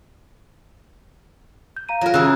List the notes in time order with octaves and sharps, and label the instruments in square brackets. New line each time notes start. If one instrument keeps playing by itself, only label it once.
[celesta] G6
F5 A#5 D#7
[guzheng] F#3 A#4 [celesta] F4 F5 A#5
[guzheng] C#3 E3 [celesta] A#5 E6 F#6